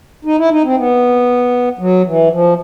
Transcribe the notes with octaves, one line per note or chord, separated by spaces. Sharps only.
D#4
E4
D#4
C4
B3
F#3
E3
F3